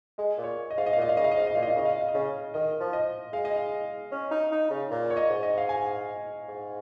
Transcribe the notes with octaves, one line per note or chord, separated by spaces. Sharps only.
G#3 D#5
A#2
C#5
D#5
G#2 F5
D#5
F5
A#2
D#5
F5
C#3 D#5
F5
D#5
G#2 F5
D#5
A#2 F5
D#5
F5
C#3 D#5
F5
D#5
F5
D#5
C#3
D#3 D#5
F3
D#5
G#3 F5
D#5
F5
C#4
D#4
D#4
C#3
A#2 A#5
C#5
D#5
G#2
D#5
F5
G#5
G#2